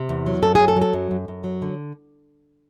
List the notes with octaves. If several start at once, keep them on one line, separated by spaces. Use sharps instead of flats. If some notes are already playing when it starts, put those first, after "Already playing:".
Already playing: C3
E2
F#3
F#2 A4
F#3 G#4
A4
F#3
A4
F#2
F#2
F#2
F#3
D3